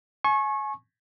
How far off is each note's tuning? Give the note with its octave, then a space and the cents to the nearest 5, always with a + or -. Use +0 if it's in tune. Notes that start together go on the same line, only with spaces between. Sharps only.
G#5 +35 C#6 -25